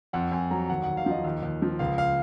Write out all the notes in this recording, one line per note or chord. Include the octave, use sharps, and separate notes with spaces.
F2 F#5
F2 G#5
F#3 A#5
D#2 F#5
D#2 F#5
F5
F3 D#5
D#2
D#2
F3
C#2 F5
F5